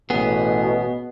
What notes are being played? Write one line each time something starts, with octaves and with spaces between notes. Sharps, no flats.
A1 B2 B3 G#4